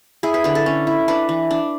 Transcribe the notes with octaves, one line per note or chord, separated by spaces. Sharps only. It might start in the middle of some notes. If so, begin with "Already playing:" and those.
E4 G#4
B4
D3 B4
A4
C#4
E4
D4 B4
E3
D4